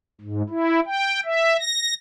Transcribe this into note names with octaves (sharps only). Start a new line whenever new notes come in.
G#2
E4
G5
E5
A#6